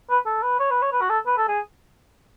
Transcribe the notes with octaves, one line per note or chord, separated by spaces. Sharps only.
B4
A4
B4
C#5
B4
C#5
B4
F#4
A4
B4
A4
G#4